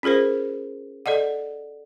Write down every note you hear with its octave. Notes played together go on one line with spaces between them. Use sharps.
C#4 F4 G#4 A#4 C5
A4 D5 D#5 F#5